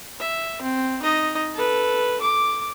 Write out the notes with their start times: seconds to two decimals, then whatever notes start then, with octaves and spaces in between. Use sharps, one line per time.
0.20 E5
0.62 C4
1.02 D#4 D#5
1.54 A4 B4
2.21 D6